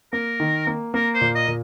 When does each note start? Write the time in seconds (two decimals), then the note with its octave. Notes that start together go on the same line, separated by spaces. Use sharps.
0.13 A#3 A#4
0.40 D#3
0.67 A#3
0.94 A#3 A#4
1.14 C5
1.21 A#2
1.35 D#5
1.48 A#2